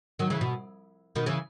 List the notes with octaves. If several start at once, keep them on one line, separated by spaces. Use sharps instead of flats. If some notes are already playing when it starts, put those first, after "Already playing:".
D#3 F#3
C#3 E3
B2
B2 D#3
C#3 E3